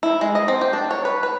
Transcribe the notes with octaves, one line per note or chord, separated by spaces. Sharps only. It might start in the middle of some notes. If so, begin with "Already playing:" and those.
E4
G#3
D#5
C4
G4
D4
C#5
B4
B4